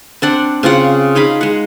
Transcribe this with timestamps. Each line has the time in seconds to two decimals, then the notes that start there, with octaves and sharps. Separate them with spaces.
0.22 C4 D4 F#5
0.63 C#3 C4 F4 F#5
1.15 D#4 G#4 F5 B5
1.41 G#3 F#5